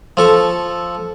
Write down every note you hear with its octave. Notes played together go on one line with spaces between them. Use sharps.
F3 A4 C#6